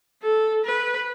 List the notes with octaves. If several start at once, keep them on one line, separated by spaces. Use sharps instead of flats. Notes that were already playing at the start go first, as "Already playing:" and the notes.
A4
B4